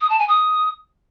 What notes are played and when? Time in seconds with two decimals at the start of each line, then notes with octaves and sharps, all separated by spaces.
0.01 D#6
0.10 A5
0.19 G#5
0.28 D#6